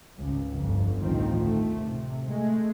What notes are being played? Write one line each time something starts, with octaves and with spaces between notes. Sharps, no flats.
G#1 C#2
G1 F2
A1 D2 D#3 F3 C4
A3
C3
G#3 A3